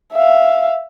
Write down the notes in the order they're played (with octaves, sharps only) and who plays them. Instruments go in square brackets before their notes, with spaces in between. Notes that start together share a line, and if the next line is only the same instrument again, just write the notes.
[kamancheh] E5 F5